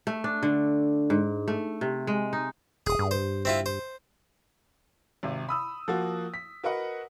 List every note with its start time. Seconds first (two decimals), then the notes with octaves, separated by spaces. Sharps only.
0.07 A3
0.24 D4
0.43 D3
1.10 G#2
1.48 A3
1.81 C3
2.07 G#3
2.33 D#4
2.87 D#1 G#4 D#6
2.99 G2
3.11 C5
3.45 C4 E4 F4
3.66 C5
5.23 G#1 C3
5.49 B5 D#6 E6
5.88 F3 A#3 F#4
6.34 B6
6.63 F#4 A#4 B4 D#5 F#5